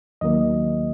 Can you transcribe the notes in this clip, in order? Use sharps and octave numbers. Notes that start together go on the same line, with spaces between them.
D#2 D#3 F#3 A#3 D#5